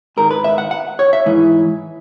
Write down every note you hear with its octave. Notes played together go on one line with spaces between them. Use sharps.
G#2 D#3 A#4
B4
E5
F#5
F#5
C#5
E5
G#2 E3